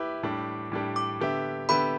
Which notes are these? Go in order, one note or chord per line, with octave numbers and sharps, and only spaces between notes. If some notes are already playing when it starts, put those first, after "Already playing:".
Already playing: E4 G4 B4 D6
A2 G3 D4 G4
A2 G3 D4 G4
D6
D3 B3 G4 E5
D3 B3 G4 E5 B5